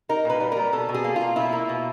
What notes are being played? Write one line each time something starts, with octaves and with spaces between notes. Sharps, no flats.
D#4 A#4
A#2 B4
G3
G3 A#4
B2 A4
B2
G#4
A#3
A#3 F4
B2 E4
A#3
B2